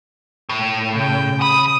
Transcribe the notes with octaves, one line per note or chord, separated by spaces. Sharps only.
A2
C#3 G5
D#2 B5 D#6